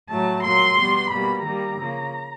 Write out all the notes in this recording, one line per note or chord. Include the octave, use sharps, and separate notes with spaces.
A2 F#3 A3 A5
A#2 F#3 A#3 C6
B2 G3 B3
B2 G3 A#3 B5
D#3 G3 A#3 A#5
C#3 F3 A#3